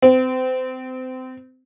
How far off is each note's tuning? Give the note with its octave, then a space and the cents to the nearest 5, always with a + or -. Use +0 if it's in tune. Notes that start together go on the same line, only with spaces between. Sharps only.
C4 -30